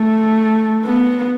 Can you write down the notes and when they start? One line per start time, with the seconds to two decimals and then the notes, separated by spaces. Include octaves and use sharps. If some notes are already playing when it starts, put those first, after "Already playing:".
Already playing: A3
0.85 B3